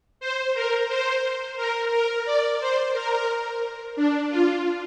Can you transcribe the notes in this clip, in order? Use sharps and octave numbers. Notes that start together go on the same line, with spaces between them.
C5
A#4
C5
A#4
A#4
D5
C5
A#4
D4
F4